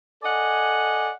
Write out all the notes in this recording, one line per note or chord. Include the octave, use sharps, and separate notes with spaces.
A4 D5 D#5 F#5 G#5